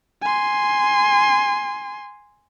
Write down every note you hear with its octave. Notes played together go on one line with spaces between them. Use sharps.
G#5 C6